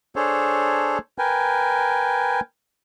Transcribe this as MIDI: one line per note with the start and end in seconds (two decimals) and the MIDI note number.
0.16 0.98 62
0.16 0.98 68
0.16 0.98 69
0.16 0.98 72
0.16 0.98 73
1.18 2.40 70
1.18 2.40 71
1.18 2.40 79
1.18 2.40 80